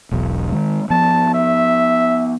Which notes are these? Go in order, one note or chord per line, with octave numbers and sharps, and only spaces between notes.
E1 B1 B2
D#3 G#3
F3 B3 A5
E5